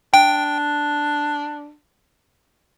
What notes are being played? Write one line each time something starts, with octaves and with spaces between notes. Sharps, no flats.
D4 G5